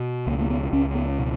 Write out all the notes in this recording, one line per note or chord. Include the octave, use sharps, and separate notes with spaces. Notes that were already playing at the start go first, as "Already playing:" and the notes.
Already playing: B2
C#2 A#3
A#3
B3
C#2 C#4
B3
B2